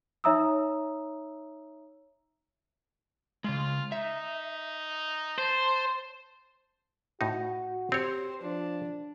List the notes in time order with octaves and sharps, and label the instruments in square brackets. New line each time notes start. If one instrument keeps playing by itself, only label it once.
[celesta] D#4 C#5 E5 A#5 D#6 E6
[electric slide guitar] C#3 G#3 [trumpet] F4
[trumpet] D#4 [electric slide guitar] E5
[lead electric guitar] C5 [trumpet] A5
[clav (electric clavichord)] A2 D#4 [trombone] F#4
[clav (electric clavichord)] C4 C#5 [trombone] G4 [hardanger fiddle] C5
[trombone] F3 [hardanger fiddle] D4